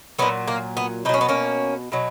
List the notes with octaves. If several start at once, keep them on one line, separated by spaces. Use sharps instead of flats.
A#2 F#3 B3
A#3
B3
B2 F#3 C#4 D#4
B3
A#3 C#4
B2 F#3